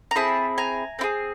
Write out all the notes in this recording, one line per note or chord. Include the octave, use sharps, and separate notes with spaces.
A#5
C4 E4 G#4 A5 B5
G#5 A#5
C4 E4 G#4